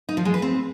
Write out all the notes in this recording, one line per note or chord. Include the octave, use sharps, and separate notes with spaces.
D#4
F3
G#3
B4
C4